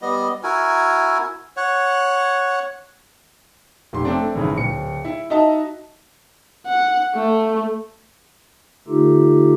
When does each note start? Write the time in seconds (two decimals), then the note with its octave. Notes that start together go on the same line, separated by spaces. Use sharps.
0.02 G3 B3 D#5
0.43 E4 F#4 A#4 G#5
1.57 C#5 F#5
3.93 F1 C6
4.05 A3 C4 D4
4.35 G#1 C#3 E3
4.57 D1 C#7
5.05 E4
5.30 D#4 F#4 D#5 E5 A5
6.67 F#5
7.16 A3
8.88 D3 A3 D#4 F4 G4 A4